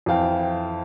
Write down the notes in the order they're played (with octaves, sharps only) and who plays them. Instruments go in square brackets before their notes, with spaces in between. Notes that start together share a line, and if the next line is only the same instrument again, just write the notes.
[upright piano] F2 E3 F5 G5